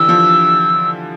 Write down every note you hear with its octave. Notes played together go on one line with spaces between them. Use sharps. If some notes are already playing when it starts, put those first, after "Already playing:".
Already playing: D3 E3 G3 E6
F3